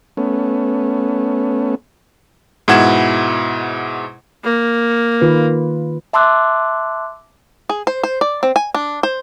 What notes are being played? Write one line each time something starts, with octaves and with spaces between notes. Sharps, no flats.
A3 B3 C#4
G#2 B2 E4 F#5 G#6 E7
A#3
D#3 F4 B4
E5 A5 C6 D6 E6 F#6
G#4
C5
C5
D5
C4
G#5
D4
C5